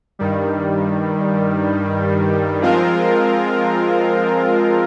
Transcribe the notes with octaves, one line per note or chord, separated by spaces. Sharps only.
G2 D#3 G3
F3 G#3 C4 F4 A#4